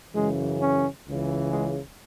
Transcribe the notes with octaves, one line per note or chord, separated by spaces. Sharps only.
F#2 C#3 E3 G#3
C#4
C#2 C#3 E3
G#3